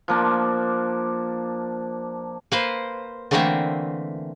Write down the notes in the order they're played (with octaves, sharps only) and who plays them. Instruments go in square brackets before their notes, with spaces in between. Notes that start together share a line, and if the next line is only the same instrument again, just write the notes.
[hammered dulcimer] F3 A#3 D4
[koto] A#3 B4 C5
D3 E3 A3 A#3 C4 E5